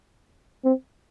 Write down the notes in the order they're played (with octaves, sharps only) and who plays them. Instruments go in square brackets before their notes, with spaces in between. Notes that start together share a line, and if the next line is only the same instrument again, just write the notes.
[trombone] C4